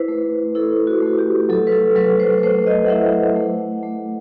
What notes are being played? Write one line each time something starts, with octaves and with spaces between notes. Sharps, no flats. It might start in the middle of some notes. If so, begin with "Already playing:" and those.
Already playing: E4 B4 C5
A3
E4 A4
F#4
A3
G4
F#3 A4
B4
A4
F#3 B4
C5
A3 C5
D#5
F#5
E4 E5
F#5
A3 F#5
A3